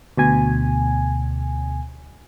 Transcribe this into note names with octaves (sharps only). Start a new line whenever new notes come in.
D2 B2 G#5